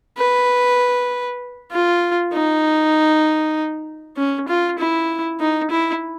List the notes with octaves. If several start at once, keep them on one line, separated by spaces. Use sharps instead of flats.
B4
F4
D#4
C#4
F4
E4
D#4
E4